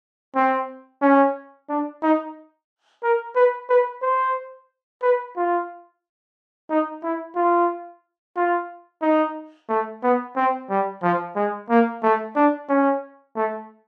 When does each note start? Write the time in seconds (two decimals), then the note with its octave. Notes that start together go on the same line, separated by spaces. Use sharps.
0.36 C4
1.02 C#4
1.69 D4
2.02 D#4
3.03 A#4
3.36 B4
3.70 B4
4.02 C5
5.03 B4
5.37 F4
6.69 D#4
7.03 E4
7.36 F4
8.37 F4
9.02 D#4
9.69 A3
10.03 B3
10.36 C4
10.70 G3
11.03 F3
11.36 G#3
11.70 A#3
12.03 A3
12.36 D4
12.69 C#4
13.36 A3